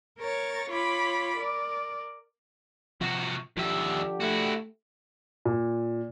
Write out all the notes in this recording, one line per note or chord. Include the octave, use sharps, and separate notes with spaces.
A#4 C#5 C#6 A6
F4 C#5 B5 D6
A#4 D5
C3 F3 F#4
D#2 D3 F3 G4 E5
A3 E4 F#4
A#2